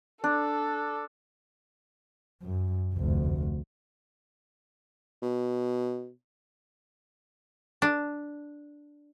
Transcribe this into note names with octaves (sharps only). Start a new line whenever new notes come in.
D4 A4
F#2
F1 D2
B2
D4